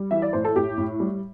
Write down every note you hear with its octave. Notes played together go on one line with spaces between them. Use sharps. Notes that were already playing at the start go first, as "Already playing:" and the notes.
Already playing: G3
E3 E5
D5
A2 C5
A4
A2 G4
A2
G3